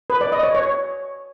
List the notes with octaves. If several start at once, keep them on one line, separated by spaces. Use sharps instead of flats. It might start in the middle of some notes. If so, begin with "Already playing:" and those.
B4
D5
D#5
C#5
C#5